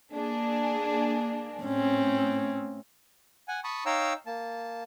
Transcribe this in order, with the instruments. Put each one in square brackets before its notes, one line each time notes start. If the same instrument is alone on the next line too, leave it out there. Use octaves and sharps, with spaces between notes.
[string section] A#3 D4 G#4
[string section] A2 [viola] C4 C#4
[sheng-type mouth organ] F#5 G#5
A5 B5 C#6 D#6
D#4 C#5 F5 G5 A#5 E6
A#3 A5